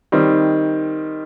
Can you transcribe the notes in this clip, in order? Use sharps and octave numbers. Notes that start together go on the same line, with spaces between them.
D#3 G3 C4 D#4